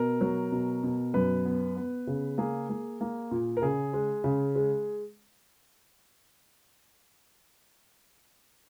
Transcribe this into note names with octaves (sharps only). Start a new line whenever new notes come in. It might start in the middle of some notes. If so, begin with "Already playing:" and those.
Already playing: B2 A#4
F#3
B2
B2
F#2 B4
B3
B3
C#3
A#3 G#4
A#3
A#3
A#2
A#4
C#3 G#4
G#3
C#3
G#3